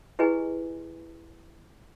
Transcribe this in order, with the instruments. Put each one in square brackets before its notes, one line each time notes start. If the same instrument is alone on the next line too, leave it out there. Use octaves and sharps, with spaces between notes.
[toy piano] E4 G4 G#4 B4 D#5 G#5